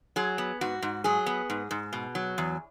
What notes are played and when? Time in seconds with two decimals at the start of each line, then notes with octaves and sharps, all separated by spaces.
0.16 F#3 G#4
0.38 B3
0.61 G#2 F#4
0.82 G#2
1.04 F#3 G#4
1.26 B3
1.50 G#2
1.71 G#2
1.93 B2
2.15 F#3
2.38 E2